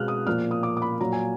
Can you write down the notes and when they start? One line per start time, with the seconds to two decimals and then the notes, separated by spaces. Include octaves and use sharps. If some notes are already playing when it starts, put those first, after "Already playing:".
Already playing: B2 G#3 B3 F6 F#6
0.08 D#6
0.26 A#2 F3 A#3 F6
0.51 D#6
0.63 D6
0.77 D6
0.82 B5
1.00 A#2 F#3 A#3 A#5
1.13 G#5